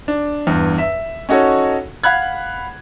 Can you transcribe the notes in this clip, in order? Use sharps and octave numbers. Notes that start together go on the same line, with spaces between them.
D4
E2 G2
E5
C#4 D#4 F#4 A4 C#5
F5 F#5 B5 F#6 G#6